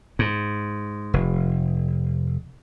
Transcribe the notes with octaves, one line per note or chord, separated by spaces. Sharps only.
G#2
F1